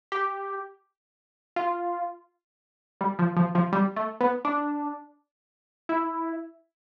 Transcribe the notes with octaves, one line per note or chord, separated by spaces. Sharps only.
G4
F4
G3
F3
F3
F3
G3
A3
B3
D4
E4